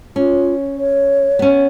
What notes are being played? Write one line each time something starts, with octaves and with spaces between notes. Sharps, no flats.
C#4 F4
C#5
B3 C#4